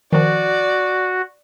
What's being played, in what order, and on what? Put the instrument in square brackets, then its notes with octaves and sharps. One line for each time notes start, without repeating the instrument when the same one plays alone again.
[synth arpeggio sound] D#3 F3 [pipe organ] F#4 [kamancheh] D5